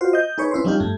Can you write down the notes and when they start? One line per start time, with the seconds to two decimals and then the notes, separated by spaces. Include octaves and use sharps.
0.01 F4 F#4 C5
0.13 D#5 G6
0.38 D#4 G#4 B4 C#5
0.51 C#4 E4 B4 C5
0.64 F3 G3 C#4 D#4 F4 G4
0.80 G2 A3